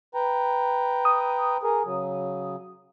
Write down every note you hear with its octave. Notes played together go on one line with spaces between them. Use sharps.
B4 G5 A#5
D#6
G#4 A#4
C#3 F#3